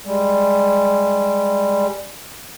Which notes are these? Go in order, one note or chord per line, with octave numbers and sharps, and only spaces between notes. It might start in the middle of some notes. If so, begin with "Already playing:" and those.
G3 G#3